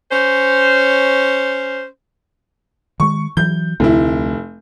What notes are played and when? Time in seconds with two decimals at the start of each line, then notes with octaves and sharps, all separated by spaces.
0.11 C#4 C5
3.00 D#3 G#3 C#6
3.37 E3 F#3 G6
3.80 F1 D2 C4 E4